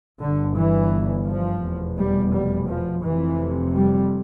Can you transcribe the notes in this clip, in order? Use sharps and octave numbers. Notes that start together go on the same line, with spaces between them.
G1 G2 D3
E3
F3
F1 E2 B2
G3
G3
F3
F1 F2 C3 E3
G3